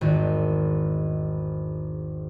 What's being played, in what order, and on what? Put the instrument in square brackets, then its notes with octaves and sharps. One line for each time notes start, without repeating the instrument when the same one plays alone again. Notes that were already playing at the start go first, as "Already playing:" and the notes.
[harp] G#1 E2 G#2